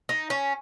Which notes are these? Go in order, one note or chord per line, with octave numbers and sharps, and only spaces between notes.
D#4
C#4